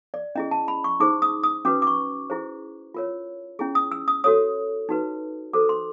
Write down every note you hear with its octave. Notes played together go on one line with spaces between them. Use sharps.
D5
C#4 E4 G#4 D#5
A5
B5
C#6
D#4 G#4 C5 D6
D#6
D#6
C#4 F#4 B4 D6
D6
C#6
E4 G#4 C5
F4 A#4 C#5
C#4 E4 G#4
D#6
E6
D#6
F#4 A4 C#5 D#6
D#4 F#4 B4
F#4 A4 C5 D6
C6